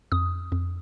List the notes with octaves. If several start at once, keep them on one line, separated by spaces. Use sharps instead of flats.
F2 D#6
F2